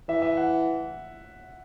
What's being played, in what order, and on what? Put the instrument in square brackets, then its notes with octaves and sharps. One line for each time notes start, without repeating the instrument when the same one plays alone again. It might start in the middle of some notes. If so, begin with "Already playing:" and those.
[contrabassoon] E3 [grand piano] E5
[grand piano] E5
F#5